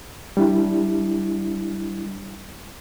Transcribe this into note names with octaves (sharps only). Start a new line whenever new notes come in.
G3 D4 E4